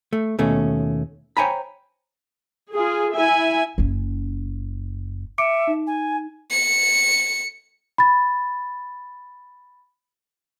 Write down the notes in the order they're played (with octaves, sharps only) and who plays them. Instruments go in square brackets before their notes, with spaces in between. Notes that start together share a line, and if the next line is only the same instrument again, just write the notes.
[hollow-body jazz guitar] A3
D#2 B2 A3 C#4
C5 C#5 G5 G#5 A#5 B5
[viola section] F4 G#4
E4 E5 G#5
[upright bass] F#1 C#4
[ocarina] E5 [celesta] D6 C#7 D7
[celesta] D#4
[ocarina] G#5
[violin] C#7
[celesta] B5 A6